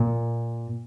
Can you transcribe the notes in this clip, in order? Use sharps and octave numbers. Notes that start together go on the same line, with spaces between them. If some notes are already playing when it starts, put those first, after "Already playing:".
Already playing: A#2